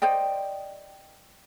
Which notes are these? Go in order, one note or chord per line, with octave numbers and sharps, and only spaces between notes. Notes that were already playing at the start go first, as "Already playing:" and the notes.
C5 D5 D#5 G5